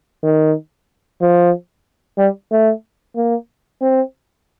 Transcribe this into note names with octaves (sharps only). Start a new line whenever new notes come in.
D#3
F3
G3
A3
A#3
C4